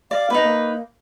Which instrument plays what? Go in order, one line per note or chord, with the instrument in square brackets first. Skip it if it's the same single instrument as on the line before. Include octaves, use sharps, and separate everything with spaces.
[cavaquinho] D5 [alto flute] F5
[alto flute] B3 [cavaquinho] D#4 B4
[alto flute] A#3